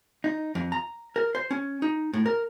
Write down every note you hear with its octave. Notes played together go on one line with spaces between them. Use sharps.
D#4
F2
A#5
A#4
C5
C#4
D#4
A2
A#4